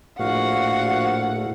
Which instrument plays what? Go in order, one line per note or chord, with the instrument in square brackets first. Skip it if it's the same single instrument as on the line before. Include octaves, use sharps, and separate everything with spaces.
[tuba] A#1 [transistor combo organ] A2 [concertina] F#4 F5 [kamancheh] F#5